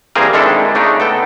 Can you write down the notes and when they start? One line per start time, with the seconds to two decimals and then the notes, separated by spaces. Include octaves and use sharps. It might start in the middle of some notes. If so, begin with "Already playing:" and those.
0.15 E3 G3 A#3 C4 G#4 A#4
0.33 D#3 G#3 C4 D4 E4 A4
0.75 C#3 A3 D4 D#4
1.00 B3 A4 G5